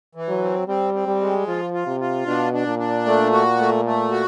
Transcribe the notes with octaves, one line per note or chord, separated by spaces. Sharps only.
E3
F#3
C4
G3 C4
C4
G3
G#3
F3 F4
F4
C3
F4
B2 D4
D4
A#2
D4
A3
F#4
A3
A3
F#4